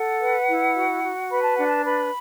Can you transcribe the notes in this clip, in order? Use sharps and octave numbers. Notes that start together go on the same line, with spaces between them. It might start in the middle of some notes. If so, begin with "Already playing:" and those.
Already playing: A4 F#5
B4
E4
F#4
F#4
B4 B5
A5
D4 F#5
A5
B4 B5